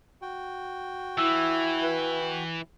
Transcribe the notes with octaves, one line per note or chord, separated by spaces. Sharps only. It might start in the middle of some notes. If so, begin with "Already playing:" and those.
F#4 G5
E3 E4 E6
B4